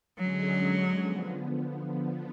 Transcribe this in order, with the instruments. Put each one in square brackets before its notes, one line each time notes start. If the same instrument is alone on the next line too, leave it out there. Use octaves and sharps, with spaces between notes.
[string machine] D3 G#3 C#4 G#4 [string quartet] F#3
[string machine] D3 F3 B3